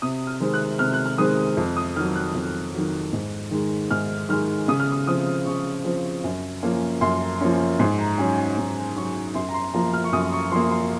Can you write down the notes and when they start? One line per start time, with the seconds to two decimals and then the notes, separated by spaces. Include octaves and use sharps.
0.02 C3 D#6
0.27 F6
0.40 D#3 G#3 C4
0.54 F#6
0.79 C3 F6
0.93 F#6
1.06 F6
1.18 D#3 G#3 C4 D#6
1.57 F2
1.77 D#6
1.96 D#3 F#3 F6
2.15 F#6
2.34 F2
2.74 D#3 F#3
3.13 G#2
3.51 D#3 G#3
3.91 G#2 F6
4.29 D#3 G#3 F6
4.68 C#3 D#6
4.80 F6
4.92 D#6
5.07 F3 C4 D#6
5.46 C#3 C#6
5.85 F3 C4
6.24 F#2
6.63 F3 A#3 C#4
7.01 F#2 C6
7.41 F3 A#3 C#4
7.79 G#2 C6
7.98 A#5
8.18 F#3 C#4 G#5
8.38 G#5
8.57 G#2 A#5
8.96 F#3 C#4 C#6
9.34 F#2 C6
9.49 A#5
9.54 C6
9.74 F3 A#3 A#5
9.94 F6
10.04 C#6
10.13 F#2 D#6
10.32 C#6
10.52 F3 A#3 C6
10.71 C6